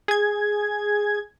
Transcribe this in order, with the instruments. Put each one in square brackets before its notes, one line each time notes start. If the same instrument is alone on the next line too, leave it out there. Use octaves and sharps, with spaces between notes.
[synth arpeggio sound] G#4 G#6